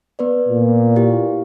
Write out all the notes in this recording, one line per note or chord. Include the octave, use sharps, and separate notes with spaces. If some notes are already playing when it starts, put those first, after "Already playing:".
B3 B4 D5
A#2
E4 G4 F5